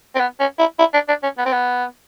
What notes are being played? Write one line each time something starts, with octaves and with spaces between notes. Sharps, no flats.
C4
B3
C#4
E4
E4
D4
D4
C#4
B3
C4
B3